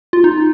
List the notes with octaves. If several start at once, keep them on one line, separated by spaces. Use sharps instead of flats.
F4
D#4